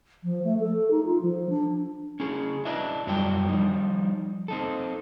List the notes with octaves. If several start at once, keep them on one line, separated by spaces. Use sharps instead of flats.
F3
A3
A4
D#4
F4
F3
D4
C#4 E4 G#4
D4 E4 B4 D#5 E5
F#2 F#3 G3 F4 D5 G5
F3 G3 D#4
C4 D#4 A4